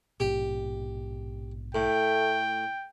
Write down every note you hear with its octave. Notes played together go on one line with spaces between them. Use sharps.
A#1 G#2 B2 G4
A2 A3 G5